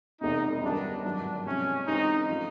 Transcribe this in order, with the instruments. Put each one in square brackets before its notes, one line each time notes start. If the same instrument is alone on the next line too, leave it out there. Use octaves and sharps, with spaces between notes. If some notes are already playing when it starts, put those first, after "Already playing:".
[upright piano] E1 E2 C3 [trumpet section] D#4
[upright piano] G1 F#2 D#3 G3 B3 [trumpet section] D4
[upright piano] G#1 G2 D#3 F#3 [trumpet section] D4
[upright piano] C3 F3 G#3 [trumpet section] C#4
[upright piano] C#3 E3 G#3 C4 [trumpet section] D#4
[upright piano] F3 A3 C#4 F4